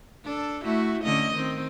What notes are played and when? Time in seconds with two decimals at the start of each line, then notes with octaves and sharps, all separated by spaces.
0.24 D4 A4
0.64 A3 E4 F#4
1.04 D3 C#4 D#5
1.34 D#3 C4